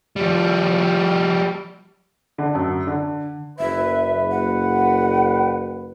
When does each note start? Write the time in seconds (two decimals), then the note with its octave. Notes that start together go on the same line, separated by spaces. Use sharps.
0.16 F3 G3
2.38 D3
2.55 F#2
2.87 D3
3.59 F#1 B4 E5
4.31 F#5